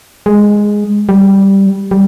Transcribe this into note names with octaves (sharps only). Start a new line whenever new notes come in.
G#3
G3
G3